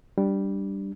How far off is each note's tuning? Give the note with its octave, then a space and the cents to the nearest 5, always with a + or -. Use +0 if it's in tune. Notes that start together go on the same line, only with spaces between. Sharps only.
G3 +0 D4 +0